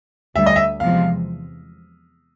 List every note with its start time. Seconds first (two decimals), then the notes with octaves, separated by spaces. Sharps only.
0.36 D2 D3 G3 E5
0.46 D#5
0.56 E5
0.80 E2 C3 F3 G#3 F5